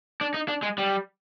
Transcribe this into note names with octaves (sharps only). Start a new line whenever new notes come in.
D4
D#4
D4
G#3
G3